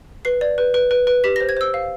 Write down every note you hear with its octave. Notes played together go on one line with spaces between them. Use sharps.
B4 C7
D5
B4
B4
B4
B4
G4 B6
C5 A#6
G#6
C5 E6
F5